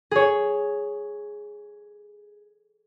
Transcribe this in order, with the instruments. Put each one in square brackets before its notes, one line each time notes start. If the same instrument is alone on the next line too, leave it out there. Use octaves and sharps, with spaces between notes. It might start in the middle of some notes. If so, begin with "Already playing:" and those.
[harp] G#4 C#5